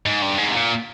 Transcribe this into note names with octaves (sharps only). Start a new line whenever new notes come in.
G#2
G2
G#2
C3
A#2